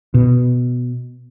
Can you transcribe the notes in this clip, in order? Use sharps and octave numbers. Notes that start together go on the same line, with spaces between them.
B2